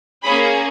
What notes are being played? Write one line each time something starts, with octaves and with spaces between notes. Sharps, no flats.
A#3 C#4 G#4 B5